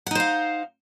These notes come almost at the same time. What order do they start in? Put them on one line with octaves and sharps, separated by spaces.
F#5 D#4 C5 F5